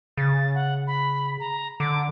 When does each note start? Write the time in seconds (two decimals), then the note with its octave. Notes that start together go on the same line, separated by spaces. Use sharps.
0.17 C#3 A6
0.54 F#5
0.87 B5
1.40 A#5
1.80 D3 D6